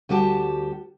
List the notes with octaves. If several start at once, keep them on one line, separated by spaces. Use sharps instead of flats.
D2 G3 F#4 G4 G#5 A5